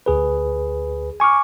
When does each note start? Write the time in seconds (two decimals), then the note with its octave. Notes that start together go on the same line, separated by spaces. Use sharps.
0.06 D2 G#4 B4
1.20 G#5 C#6 D6 F6